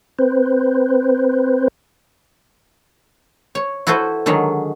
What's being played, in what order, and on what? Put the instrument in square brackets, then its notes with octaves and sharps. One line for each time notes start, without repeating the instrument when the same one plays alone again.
[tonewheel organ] C4 B4 C5
[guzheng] C#5
E4 F#4 A4 B4 C5
D3 D#3 F#3 G#3